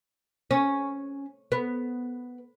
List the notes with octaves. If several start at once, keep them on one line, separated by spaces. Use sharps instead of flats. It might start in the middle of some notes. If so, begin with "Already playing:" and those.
C#4
B3